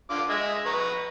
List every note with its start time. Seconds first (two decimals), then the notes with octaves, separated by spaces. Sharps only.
0.10 D3 F4 D6
0.30 G#3 G#4 E5
0.66 B4 A#5 C#6